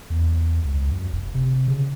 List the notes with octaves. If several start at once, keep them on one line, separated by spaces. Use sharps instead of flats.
E2
C#2
F#2
F1
C3
C#3